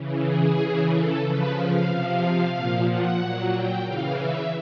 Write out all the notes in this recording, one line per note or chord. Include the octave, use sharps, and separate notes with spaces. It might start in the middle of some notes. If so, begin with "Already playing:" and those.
Already playing: C#3 E3
G#4
C#3 E3
A4
C#3 F3 B4
F5
C3 F3
A#2 F3
F#5
A#2 F#3
G5
C#3 E3 F5
E5